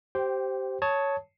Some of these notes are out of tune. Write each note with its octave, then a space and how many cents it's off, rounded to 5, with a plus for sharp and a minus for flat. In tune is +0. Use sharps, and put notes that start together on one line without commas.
G4 -20 C5 +0 G5 +0
C#5 +5 A5 +0 D#6 +30